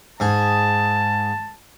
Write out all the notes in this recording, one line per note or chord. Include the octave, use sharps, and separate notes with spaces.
G#2 G#4 A5